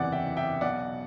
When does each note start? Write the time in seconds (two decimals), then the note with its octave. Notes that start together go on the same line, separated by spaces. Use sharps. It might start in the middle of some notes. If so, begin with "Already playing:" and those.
Already playing: F#1 E2 C3 E3 D5 F#5
0.12 E5 G5
0.37 E5 G5
0.61 B1 B2 D5 F#5